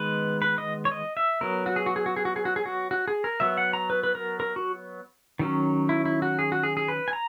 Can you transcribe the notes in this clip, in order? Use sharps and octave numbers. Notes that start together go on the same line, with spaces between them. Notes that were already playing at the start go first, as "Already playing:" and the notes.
Already playing: D#3 G#3 B3 B4
B4
D#5
C#5
D#5
E5
F#3 B3 A#4
F#4
G#4
F#4
G#4
F#4
G#4
F#4
G#4
F#4
G#4
F#4
F#4
G#4
A#4
F#3 B3 E5
F#5
A#5
B4
B4
A#4
A#4
F#4
D#3 F#3 C#4
E4
E4
F#4
G#4
F#4
G#4
G#4
B4
G#5
A#5